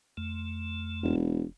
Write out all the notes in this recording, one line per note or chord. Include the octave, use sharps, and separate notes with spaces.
F2 A3
E1